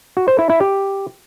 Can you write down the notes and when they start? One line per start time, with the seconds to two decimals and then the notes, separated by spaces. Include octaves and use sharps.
0.17 F#4
0.28 C5
0.39 E4
0.50 E4
0.61 G4